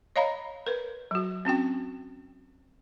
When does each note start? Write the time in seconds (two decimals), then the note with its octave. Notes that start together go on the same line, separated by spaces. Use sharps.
0.16 C#5 D#5 F5 A#5 B5
0.66 A#4 B4
1.11 F#3 F#4
1.45 C4 C#4 F#4 G5